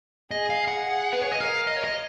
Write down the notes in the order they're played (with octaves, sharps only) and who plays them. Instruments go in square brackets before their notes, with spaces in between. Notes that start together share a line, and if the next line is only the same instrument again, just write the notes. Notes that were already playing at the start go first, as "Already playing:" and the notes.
[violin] G#4 [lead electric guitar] D#5
[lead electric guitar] F5
F#5
[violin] G#4
[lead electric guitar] B4
C#5
D#5
[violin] A#4 [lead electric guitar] F5
[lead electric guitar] D#5
C#5
D#5